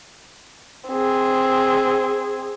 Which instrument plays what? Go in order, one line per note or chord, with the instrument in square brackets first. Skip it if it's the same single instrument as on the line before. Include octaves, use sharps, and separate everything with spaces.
[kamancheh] C4 G#4